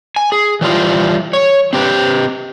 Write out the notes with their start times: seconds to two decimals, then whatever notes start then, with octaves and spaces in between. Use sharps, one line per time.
0.16 G#5
0.32 G#4
0.61 E3 G3 F4
1.33 C#5
1.73 C4 G4 B4